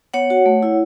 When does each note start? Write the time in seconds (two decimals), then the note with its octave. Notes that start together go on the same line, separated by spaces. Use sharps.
0.14 B3 C#5 F#5
0.30 F#4
0.46 A3
0.63 E4